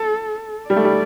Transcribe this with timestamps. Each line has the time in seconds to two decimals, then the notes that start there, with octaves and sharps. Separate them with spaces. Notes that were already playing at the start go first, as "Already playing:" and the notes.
Already playing: A4
0.70 G3 D5
0.76 A3
0.84 G3